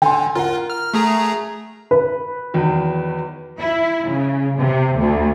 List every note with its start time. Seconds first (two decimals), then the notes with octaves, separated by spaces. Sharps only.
0.02 D3 G5 G#5 C6
0.35 F4 A#4 F#5
0.70 F6
0.94 A3 G#4 A#5
1.91 B4
2.54 E2 D#3 F#3
3.60 E4
4.08 C#3
4.58 C3
4.99 D2